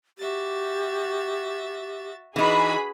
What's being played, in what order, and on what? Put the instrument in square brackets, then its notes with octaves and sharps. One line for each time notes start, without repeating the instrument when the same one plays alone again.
[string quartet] F#4 E5 A6 [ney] G4
[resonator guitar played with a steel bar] E3 D#4 [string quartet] D4 F#4 B4 [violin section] G#4 B5